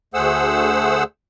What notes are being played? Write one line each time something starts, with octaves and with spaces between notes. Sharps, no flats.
D2 A3 G#4 C5 F#5 E6